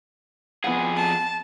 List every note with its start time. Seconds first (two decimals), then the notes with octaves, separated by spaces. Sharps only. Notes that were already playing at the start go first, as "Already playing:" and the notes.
0.64 F2 B3 G#4 F#5
0.97 A5